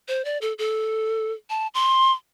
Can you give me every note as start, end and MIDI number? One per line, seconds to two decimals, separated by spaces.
0.08 0.25 72
0.25 0.38 74
0.42 0.53 69
0.58 1.32 69
1.50 1.67 81
1.74 2.13 84